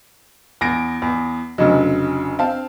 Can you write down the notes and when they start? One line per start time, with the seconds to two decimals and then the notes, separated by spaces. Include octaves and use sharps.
0.61 E2 A#6 D7
1.02 E2
1.58 F1 C#3 F#3 D4 D#5
2.39 C4 F5 A5